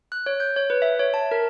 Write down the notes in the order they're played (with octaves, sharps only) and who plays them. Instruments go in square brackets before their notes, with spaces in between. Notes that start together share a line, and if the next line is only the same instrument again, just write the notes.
[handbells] F#6
C#5
G6
C#5
B4
E5
C#5
A5
A#4